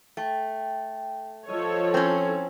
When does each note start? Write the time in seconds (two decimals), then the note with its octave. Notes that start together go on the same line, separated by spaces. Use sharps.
0.17 A3 G5
1.49 F3 F4 A4 C#5 D#5
1.94 C4 C#4 E4